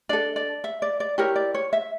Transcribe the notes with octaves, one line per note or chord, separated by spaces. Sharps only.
D4 A4 D5
D5
E5
D5
D5
E4 G4 A#4 C#5
D5
C#5
E5